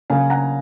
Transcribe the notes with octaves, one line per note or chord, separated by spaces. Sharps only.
C#3 F#3 A#3 F5 G#5
F#5 A#5